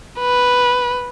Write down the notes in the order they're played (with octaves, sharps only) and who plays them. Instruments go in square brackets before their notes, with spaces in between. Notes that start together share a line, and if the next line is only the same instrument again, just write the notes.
[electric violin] B4